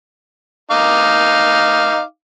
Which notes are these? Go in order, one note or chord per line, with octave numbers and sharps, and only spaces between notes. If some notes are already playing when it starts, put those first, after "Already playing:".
D#4 F5 D6